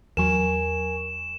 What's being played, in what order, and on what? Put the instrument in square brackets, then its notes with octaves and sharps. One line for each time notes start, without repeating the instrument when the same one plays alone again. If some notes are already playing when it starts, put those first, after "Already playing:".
[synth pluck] E2 F#3 [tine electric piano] A#4 G#5 C#6 [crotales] E7